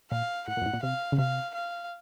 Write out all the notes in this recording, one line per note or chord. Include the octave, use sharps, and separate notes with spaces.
A#2 F5
A2 F#5
A#2
F#2
A2
A#2
C3 F5
C#3
C3 F5
F5